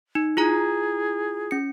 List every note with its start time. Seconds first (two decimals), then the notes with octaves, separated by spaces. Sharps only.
0.15 D#4
0.37 E4 F4 G#4 A#5
1.51 C#4 C#7